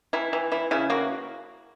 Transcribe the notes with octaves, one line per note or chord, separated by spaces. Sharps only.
E3 E4
E3
E3 E4
C#3 E4
A#3 F#4